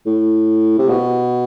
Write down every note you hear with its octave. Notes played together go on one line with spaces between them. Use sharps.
A2
C3
B2